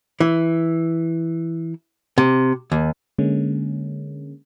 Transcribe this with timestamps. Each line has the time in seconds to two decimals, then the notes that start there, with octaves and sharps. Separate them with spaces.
0.20 E3
2.18 C3
2.72 D#2
3.18 D3 G#3 A#3 C#4